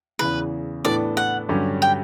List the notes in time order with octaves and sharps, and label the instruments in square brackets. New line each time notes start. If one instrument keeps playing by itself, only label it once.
[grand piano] E2 C#3 E3 [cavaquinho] B4
[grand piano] A2 E3 B3 D4 A4 [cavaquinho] D5
[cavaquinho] F#5
[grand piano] G2 D3 F#3 C#4 G4
[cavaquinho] G5